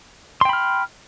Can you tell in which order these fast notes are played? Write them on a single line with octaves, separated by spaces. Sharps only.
C6 G5 B5 F6